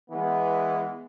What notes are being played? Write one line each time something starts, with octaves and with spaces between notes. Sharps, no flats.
E3 G#3 B3